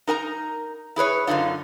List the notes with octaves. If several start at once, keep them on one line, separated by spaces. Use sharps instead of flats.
D#4 A#4 G#5 A#5
E4 G#4 B4 C#5
F#2 A#2 D3 D#4 F4